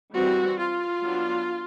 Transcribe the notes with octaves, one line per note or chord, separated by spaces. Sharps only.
E3 G3 C4 F#4
F4
F#3 B3 D4